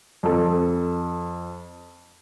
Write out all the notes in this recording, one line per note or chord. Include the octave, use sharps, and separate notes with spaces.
F2 A4